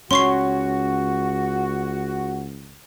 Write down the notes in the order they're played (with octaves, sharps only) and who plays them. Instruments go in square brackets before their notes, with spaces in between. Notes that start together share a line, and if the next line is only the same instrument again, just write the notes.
[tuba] C#2 [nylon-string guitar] C#4 [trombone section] F#4 [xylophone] C6 C#6 C7